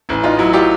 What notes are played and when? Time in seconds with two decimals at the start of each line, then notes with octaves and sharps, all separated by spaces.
0.09 A1 E4
0.24 D#4 F4
0.38 F#3 E4
0.53 F4 G4